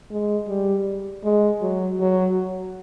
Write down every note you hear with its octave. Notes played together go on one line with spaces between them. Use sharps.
G#3
G3
G#3
F#3
F#3